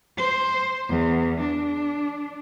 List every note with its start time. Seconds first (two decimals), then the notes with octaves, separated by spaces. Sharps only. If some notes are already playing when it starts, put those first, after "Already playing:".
0.18 C5
0.89 E2
1.40 D4